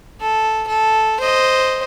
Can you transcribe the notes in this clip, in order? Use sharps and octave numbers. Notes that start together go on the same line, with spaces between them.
A4
A4
C5 D#5